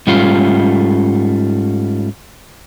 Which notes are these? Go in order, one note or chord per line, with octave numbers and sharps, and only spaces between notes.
G#2 G3 A3 C#4 F4